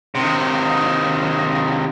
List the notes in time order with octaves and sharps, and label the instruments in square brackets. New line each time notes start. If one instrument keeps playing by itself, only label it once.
[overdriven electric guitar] C3 D#3